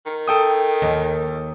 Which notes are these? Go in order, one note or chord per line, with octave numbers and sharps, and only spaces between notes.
D#3
A4 G5 D#6
D#2